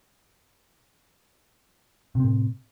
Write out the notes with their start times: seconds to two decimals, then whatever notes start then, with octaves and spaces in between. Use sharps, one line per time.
2.15 C3
2.20 C4
2.24 A2